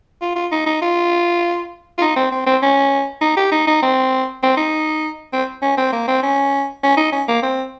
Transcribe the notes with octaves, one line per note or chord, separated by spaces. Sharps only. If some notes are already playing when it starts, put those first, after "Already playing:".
F4
F4
D#4
D#4
F4
F4
D#4
C4
C4
C4
C#4
D#4
G4
D#4
D#4
C4
C4
D#4
C4
C#4
C4
A#3
C4
C#4
C#4
D#4
C#4
A#3
C4